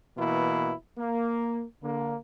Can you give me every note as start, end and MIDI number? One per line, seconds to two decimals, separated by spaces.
0.18 0.73 47
0.18 0.73 52
0.18 0.73 58
0.18 0.73 64
0.98 1.64 58
1.83 2.16 50
1.83 2.16 58